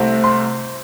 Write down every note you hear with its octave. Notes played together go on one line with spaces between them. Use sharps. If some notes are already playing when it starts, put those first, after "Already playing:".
Already playing: C2 C3 A3 C4
C6